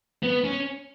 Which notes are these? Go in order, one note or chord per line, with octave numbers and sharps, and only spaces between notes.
B3
C#4